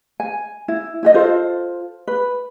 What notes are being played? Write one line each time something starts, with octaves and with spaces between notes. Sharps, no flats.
G#5
E4
E4 G4 D#5
F4 A4 C5
B4